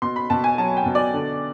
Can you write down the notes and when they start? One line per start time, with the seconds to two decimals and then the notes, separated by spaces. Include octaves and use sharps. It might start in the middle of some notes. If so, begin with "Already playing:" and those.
0.02 B2 C6
0.16 B5
0.30 B2 A5
0.44 G#5
0.58 F#3 A5
0.77 G5
0.86 B2
0.95 D5
1.14 D3